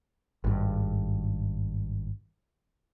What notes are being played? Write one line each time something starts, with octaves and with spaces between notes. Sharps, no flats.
G#1 G2